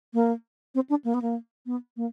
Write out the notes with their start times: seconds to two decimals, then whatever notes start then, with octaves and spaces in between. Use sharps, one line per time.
0.14 A#3
0.75 C4
0.90 D4
1.04 A#3
1.14 B3
1.22 A#3
1.66 B3
1.97 A#3